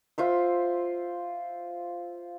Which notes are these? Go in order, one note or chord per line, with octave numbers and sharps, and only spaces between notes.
F4 C5 E5